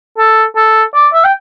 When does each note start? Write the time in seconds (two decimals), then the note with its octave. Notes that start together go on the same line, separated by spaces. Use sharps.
0.18 A4
0.56 A4
0.94 D5
1.14 E5
1.24 G5